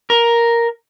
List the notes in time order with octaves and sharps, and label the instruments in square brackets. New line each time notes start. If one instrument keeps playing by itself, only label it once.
[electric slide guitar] A#4